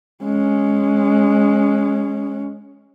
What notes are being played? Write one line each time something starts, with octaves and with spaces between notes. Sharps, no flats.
G#3 C#4